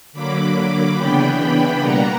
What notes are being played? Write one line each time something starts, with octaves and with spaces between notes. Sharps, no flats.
D3 F#3 A#3 B5 D6
C#3 E3 B3 D4 G5 B5
B2 G3 A#3 F#5 A#5